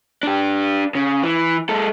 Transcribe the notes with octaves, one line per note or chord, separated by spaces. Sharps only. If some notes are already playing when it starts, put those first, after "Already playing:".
D4 G4
C#3
E3
G#3 A4